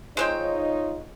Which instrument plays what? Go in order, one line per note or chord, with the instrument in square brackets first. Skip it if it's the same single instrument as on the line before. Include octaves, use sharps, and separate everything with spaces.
[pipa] G#3 C4 G5 [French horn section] D#4 F4 C#5